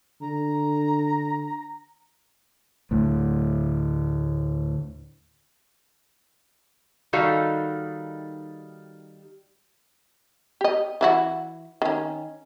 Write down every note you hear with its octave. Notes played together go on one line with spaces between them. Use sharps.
D3 A#5
D2 A2
D#3 G3 D#4 F#4 A4 F5
G4 D#5
E3 E4 F#4
D#3 C#4